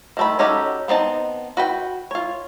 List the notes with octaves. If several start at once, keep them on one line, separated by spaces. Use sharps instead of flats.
D#3 A3 B5
C#4 D#4 F#4 G4 A4
B3 C4 D#4 A5
F#4 B4 G5
F4 C#5